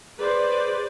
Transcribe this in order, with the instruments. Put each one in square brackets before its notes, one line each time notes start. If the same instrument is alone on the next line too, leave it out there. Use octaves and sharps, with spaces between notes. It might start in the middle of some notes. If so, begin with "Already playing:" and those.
[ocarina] G#4 [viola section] B4 C5 D5